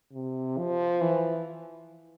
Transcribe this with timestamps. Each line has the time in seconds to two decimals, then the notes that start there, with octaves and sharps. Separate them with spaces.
0.13 C3
0.58 F3
1.01 E3